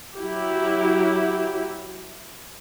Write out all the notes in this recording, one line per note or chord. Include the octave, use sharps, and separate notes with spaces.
F#3 E4 G4